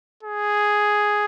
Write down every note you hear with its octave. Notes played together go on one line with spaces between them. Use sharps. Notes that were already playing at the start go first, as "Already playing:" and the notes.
G#4